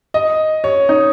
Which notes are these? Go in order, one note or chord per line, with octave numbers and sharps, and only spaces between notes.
D#5
C#5
D#4